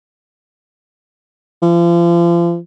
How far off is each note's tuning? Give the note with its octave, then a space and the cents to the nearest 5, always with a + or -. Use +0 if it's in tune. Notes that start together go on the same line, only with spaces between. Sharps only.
F3 -35